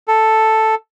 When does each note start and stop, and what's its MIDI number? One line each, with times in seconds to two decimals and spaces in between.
0.08 0.75 69